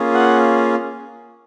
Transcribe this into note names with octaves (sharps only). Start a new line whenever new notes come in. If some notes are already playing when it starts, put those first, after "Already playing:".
Already playing: A#3 C#4 F4 G#4
F#5